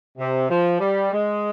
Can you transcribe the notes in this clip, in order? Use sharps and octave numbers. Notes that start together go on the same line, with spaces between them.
C3
F3
G3
G#3